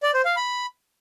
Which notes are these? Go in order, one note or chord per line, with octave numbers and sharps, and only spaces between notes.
D5
C5
F5
B5